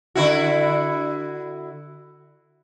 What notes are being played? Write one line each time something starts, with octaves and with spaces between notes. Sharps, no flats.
D3 E4 F#4